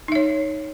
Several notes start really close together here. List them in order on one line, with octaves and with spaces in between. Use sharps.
D#4 E5 C#5